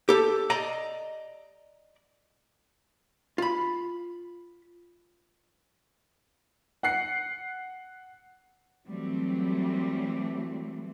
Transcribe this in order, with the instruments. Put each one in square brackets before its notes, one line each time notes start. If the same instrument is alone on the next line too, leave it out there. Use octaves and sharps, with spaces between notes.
[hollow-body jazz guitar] G4 A4
D5 D#5 A#5
F4 B5
[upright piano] F#5 F#6 C7 C#7
[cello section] E3 F#3 G3 A3 C4